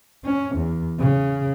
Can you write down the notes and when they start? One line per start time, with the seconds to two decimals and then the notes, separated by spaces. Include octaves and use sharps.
0.25 C#4
0.56 E2
1.00 C#3